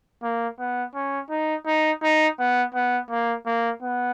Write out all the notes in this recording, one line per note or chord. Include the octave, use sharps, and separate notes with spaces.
A#3
B3
C#4
D#4
D#4
D#4
B3
B3
A#3
A#3
B3